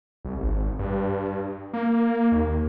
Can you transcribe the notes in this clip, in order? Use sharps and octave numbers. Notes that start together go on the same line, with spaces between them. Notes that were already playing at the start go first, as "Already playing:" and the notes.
C2
G#1
G2
A#3
D#2